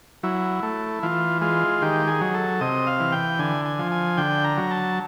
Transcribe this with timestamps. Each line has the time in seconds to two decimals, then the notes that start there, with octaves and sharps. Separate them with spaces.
0.23 F#3 E4
0.63 A3
1.03 E3 F4
1.41 G#3 F4
1.82 D#3 G4
2.07 G#4
2.21 F#3
2.34 A4
2.61 C3 D#5
2.87 F5
3.00 E3
3.12 G5
3.39 D3 G#5
3.65 G#5
3.79 F3
3.92 G#5
4.17 D3 G5
4.44 A#5
4.57 F#3
4.71 A5